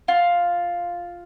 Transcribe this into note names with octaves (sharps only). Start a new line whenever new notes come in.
F4